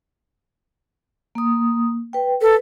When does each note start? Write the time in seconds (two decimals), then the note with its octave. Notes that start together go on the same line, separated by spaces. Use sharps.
1.35 A#3 D#6
2.13 B4 G5
2.42 A4 B4